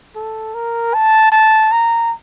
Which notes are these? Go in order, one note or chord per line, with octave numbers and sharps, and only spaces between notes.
A4
A#4
A5
A5
A#5